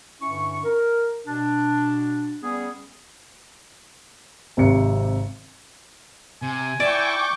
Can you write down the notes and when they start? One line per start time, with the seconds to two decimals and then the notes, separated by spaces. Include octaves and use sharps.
0.22 G2 D3 C#4 E4 C#6
0.64 A#4
1.27 B2 D4
2.43 G3 B3 C#4 G#4
4.57 G#1 C3 C#7
6.42 C3 G#5
6.80 E4 D5 G5 C#6 D6